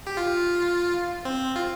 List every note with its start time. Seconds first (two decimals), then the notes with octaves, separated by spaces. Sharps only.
0.07 G4
0.17 F4
1.25 C4
1.56 F4